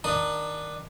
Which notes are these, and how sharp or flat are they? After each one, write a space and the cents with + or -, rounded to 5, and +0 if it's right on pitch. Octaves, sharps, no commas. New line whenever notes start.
D#3 +0 D4 +10 D#6 -10